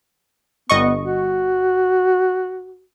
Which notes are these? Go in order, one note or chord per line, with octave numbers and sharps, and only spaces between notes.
G1 B3 D#5 C#6
F#4